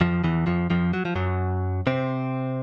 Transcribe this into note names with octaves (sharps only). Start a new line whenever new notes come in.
F2 F3
E2 E3
F2 F3
F2 F3
F#3
F3
F#2 F#3
C3 C4